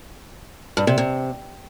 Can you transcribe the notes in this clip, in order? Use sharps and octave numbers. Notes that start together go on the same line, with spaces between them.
G2
C3
C3